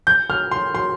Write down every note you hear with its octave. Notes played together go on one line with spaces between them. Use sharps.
G6
F6
C6
C6